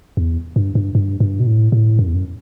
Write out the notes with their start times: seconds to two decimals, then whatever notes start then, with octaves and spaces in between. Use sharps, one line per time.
0.17 E2
0.56 G2
0.75 G2
0.95 G2
1.20 G2
1.40 B2
1.47 A2
1.72 A2
1.99 F#2
2.07 E2
2.15 F#2